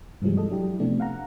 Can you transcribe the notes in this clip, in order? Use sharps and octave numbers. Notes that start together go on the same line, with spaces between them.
G2 C3 E3 F3 G3 G#3
G#3 A4 D#5
F#3 D4 E4 G4
C3 F3 A3 B3 D4
F5 F#5 A#5